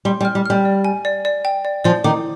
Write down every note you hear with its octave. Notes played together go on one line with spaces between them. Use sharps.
G3 C6
G3
F6
G3
G3 F6
D5
G#5
D5
D5
G5
D5
F3 D5
D#3 D6